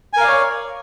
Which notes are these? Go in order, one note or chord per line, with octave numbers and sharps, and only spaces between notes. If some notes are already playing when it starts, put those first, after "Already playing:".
A#4 C#5 D5 F5 G#5